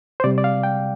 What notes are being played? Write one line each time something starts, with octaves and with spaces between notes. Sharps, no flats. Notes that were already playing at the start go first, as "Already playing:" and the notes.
C5
C3 G3 D5
D5
F5
G5